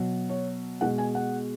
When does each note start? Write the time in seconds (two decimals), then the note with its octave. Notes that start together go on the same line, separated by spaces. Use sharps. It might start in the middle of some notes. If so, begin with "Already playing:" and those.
Already playing: B2 F#3
0.29 C#5
0.81 B2 G#3 F#5
0.98 G#5
1.15 F#5